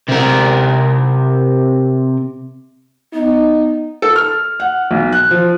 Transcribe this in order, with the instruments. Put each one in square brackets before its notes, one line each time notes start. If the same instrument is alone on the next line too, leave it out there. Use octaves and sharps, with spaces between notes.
[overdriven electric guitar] C3 A#4
[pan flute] B3 [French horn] D#4
[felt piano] A4
F6
F#5
B1
F#6
F3